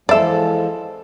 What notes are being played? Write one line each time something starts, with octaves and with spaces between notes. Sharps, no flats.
E2 F3 G#3 A4 C5 D5 E5